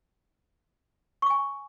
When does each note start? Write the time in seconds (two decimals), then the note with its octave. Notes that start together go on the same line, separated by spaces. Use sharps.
1.22 C#6
1.26 D6
1.30 G#5